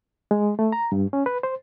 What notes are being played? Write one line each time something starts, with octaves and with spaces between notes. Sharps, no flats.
G#3
A3
A#5
G2
C#4
B4
C5